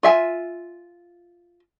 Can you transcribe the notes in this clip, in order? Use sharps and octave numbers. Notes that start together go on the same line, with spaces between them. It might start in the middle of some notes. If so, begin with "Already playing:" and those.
F4 E5 G#5